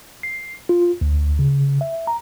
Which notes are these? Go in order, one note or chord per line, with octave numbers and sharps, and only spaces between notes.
C7
F4
D2
C#3
E5
A#5